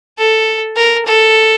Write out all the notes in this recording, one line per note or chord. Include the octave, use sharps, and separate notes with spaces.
A4
A#4
A4